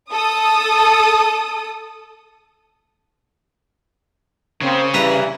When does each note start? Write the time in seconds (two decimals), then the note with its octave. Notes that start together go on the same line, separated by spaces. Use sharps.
0.12 A4 D#6
4.61 C#3 A#3 C4
4.94 G2 E3 B4 A#5